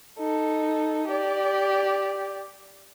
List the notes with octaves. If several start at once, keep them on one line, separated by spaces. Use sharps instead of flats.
D#4 A4
G4 D5